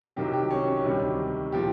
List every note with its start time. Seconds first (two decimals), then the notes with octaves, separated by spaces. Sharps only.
0.16 C2 C3 D#3 F#3 G4
0.34 G4
0.50 C#4
0.67 C#4
0.84 D2 C3 D#3 G3
1.52 A#2 F3 G#3 G4